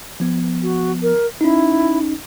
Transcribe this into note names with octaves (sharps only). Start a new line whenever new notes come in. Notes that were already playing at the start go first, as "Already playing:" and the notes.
F3 B3
F#4
A#4
C#4 D#4 E4